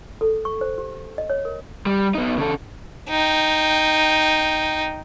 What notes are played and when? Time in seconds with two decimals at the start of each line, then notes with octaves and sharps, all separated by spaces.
0.21 A4
0.45 C#6
0.61 C5
0.78 G4
1.18 D#5
1.30 C#5
1.45 A#4
1.86 G3
2.15 B3 D#4
2.38 C#3 A4
3.09 D#4 G5